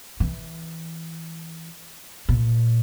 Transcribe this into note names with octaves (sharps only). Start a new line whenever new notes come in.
E3
A#2